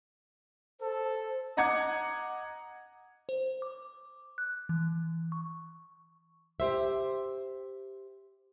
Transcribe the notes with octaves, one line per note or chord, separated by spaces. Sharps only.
A4 C5
D#5 F#5 A#5 D6 G#6 C#7
C5
D6
F#6
E3
C#6
G4 C5 E5